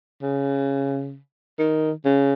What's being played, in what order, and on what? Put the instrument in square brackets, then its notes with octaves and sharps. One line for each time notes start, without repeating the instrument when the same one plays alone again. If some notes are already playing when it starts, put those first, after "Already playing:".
[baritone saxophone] C#3
D#3
C#3